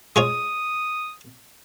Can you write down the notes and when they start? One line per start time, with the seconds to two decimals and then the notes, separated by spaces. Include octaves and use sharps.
0.16 G#3 F4 C#5 D#6